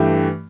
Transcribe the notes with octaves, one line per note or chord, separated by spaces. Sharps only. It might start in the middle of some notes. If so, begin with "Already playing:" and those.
Already playing: G2 E3 A3 G4